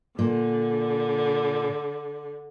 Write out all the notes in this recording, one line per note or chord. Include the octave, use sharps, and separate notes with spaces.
A#2 D3